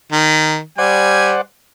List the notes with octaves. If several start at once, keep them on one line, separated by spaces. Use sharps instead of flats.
D#3
G3 C5 D5 F#5 G#5